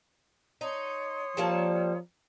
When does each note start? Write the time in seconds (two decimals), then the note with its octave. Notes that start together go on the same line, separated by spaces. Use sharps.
0.61 D#4 C#5 C6 D#6
1.37 F3 G3 A#3 A5